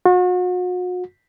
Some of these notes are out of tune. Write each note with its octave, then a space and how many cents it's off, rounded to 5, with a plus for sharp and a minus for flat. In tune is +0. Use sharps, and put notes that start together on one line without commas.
F#4 -40